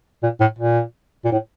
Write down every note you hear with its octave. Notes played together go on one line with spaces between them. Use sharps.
A#2
A2
A#2
A#2
A2